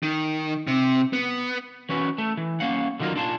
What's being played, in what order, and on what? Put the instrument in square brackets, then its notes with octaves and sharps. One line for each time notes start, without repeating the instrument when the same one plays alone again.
[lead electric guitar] D#3
C3
B3
[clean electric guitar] E3 C#4 F#4 B4
A3
E3
A#3 C#4 F5 F#5
D3 D#3 F#3 F4 A#4
D4 F4 F5 F#5 A5